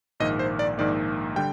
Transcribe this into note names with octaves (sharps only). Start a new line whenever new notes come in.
A#1 G#2 D#3 A#3 D#5
C5
D5
A#1 G#2 D#3 A#3 D5
D3 G3 G5